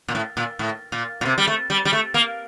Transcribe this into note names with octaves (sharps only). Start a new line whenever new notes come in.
A#2
A2
A#2
A2
A#2
A#2
C3
G3
A3
G3
G3
A3
A#3